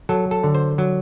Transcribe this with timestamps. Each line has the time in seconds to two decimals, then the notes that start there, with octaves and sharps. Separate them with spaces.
0.09 F#3 A4
0.31 A4
0.43 D3
0.55 C5
0.78 F#3